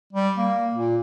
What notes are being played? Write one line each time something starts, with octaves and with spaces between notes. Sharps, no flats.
G3
A#3
A#2